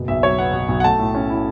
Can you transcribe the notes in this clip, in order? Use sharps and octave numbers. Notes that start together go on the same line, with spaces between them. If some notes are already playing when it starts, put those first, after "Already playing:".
Already playing: F#1 B2
B1 E5
F#3 C#5
B3 F#5
B2
B1
F#5
A3 A5
A2
C#4
E4